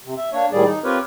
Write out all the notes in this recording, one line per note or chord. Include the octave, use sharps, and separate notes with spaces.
C3
E5
A#3 D4 C#5
A2 D#3 G3 G#4 D5
D#4
C4 F4 G4 A#4 B4 C#5